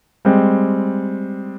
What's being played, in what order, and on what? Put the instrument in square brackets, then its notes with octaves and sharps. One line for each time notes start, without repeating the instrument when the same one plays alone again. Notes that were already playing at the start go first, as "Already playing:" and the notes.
[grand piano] G3 G#3 C4